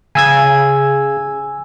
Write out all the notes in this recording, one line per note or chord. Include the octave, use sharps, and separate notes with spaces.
C#3 G#5 E6 G#6